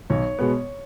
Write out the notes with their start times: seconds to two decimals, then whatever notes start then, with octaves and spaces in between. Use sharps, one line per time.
0.10 B1 C#5
0.39 B2 G#3 B3